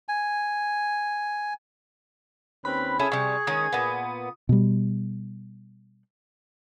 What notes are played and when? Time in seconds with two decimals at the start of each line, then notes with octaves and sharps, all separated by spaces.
0.09 G#5
2.65 D#2 C4 C#4 B4 B5
2.99 C#4 E4 G#4 A4 G#5
3.12 C3 G3 C#6
3.47 D#3 G#3 C#4 D#6
3.73 A#2 B3
4.49 B2 G3